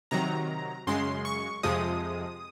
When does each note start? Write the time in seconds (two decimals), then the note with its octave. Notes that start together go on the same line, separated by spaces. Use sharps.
0.11 C3 D#3 F#3 A#5
0.87 F#2 C#3 G#3 C6
1.25 C#6
1.63 F2 C3 F3 G#3 D#6